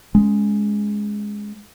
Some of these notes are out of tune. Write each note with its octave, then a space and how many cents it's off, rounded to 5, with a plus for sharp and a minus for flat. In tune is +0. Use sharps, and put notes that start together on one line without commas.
G#3 +0 C#4 +0